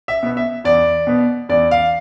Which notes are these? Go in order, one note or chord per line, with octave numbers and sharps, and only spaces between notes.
E5
B2 B3
E5
E2 D5
B2 B3
E2 D5
F5